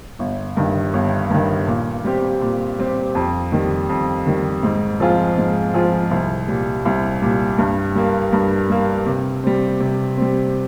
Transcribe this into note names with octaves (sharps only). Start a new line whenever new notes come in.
G1
G2 D#3
G1
G2 D#3
A#2
G3 C4 G4
A#2
G3 C4 G4
F2
D#3 G3
F2
D#3 G3
G#2
F3 C4 F4 G#4
G#2
F3 C4 F4 G#4
C2
A#2 G3
C2
A#2 G3
G2
G3 A#3
G2
G3 A#3
C3
G3 C4
C3
G3 C4